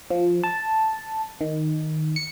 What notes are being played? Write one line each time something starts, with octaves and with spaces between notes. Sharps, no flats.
F3
A5
D#3
C#7